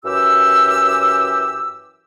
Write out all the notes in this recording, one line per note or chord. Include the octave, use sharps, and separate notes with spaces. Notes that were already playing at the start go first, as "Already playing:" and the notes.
F#2 E3 G4 E6